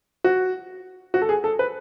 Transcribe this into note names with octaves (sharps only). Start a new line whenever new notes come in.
F#4
F#4
A4
G#4
A4
B4